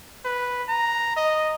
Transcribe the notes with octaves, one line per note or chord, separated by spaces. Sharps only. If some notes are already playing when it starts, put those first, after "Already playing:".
B4
A#5
D#5